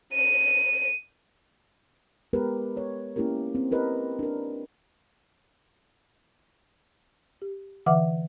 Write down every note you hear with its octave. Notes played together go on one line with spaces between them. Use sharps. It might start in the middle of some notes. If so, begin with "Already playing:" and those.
D#7
G#3 B3 G4 A#4 B4
B4 C#5
A#3 C#4 E4 G4 A#4
C4
E4 G4 A#4 B4 D#5
D4 A#4
G4
D3 E3 E5 F#5 D6